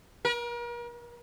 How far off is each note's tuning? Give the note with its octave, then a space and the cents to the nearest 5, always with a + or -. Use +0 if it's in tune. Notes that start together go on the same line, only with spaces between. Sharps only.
A#4 +40